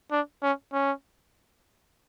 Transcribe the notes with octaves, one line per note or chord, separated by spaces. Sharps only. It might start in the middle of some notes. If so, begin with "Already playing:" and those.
D4
C#4
C#4